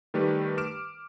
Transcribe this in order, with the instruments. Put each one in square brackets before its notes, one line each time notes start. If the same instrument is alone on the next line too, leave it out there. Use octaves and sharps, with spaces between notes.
[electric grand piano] D#3 G3 A3 G4 B4
D6 F6 D7 E7